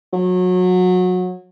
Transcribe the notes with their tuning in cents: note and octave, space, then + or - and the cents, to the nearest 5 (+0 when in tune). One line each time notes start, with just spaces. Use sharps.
F#3 -25